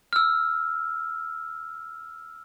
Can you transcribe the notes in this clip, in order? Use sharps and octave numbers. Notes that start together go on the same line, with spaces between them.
E6 F6